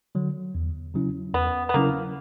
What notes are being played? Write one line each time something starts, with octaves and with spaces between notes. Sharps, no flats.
D3 F#3
E2
C#3 F#3 C#4 E4
E2 B3
B3
C#3 F#3 A#3 C#4 E4